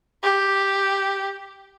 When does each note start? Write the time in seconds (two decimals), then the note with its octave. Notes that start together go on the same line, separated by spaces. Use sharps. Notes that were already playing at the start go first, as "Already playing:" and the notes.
0.23 G4